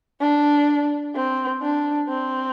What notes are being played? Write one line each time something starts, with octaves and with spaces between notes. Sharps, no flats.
D4
C4
D4
C4